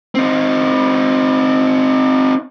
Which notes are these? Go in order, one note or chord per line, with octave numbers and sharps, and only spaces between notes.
C4 D#4